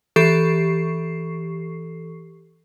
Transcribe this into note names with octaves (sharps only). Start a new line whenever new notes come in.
E3 G4 A4 C#6 C7